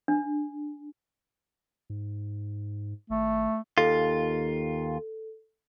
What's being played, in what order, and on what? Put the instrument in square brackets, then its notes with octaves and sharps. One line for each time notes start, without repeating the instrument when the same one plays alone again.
[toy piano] D4
[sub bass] G#2
[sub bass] G#1 [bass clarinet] A3
[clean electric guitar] D#2 F4 [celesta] A4